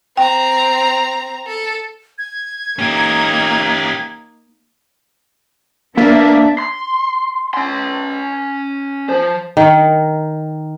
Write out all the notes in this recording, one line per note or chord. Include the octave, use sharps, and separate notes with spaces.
C4 G5 A#5
A4
G#6
A#3 C#4 D#4 G4
A#3 B3 D4 E5
C6
C#4 C6
F3 C5
D#3